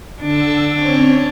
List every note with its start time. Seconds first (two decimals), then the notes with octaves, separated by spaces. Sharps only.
0.21 D3 D4 E6
0.73 C4 C#4 C#5